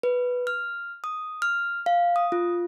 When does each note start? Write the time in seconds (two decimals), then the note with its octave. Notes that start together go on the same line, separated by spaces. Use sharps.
0.03 B4
0.47 F6
1.04 D#6
1.42 F6
1.86 F5
2.16 D#6
2.32 F4